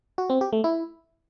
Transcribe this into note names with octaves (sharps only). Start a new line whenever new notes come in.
F#4
C4
G4
A3
E4